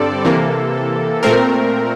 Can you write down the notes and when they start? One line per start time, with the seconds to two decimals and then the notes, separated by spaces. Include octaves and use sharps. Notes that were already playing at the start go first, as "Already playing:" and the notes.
Already playing: G2 D3 G3 C4 A4 D5
0.25 C3 E3 A#3
1.23 A#2 A3 C4 A#4